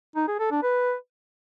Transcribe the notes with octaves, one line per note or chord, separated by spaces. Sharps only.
D#4
G#4
A4
D4
B4